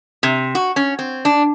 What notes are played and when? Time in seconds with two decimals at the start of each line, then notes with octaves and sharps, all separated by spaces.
0.23 C3
0.55 F#4
0.76 C#4
0.99 C4
1.25 D4